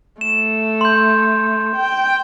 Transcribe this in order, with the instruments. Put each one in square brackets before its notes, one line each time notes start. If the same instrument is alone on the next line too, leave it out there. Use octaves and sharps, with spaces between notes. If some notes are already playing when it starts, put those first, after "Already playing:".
[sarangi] A3 [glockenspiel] E7
[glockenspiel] C6 G6
[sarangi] G5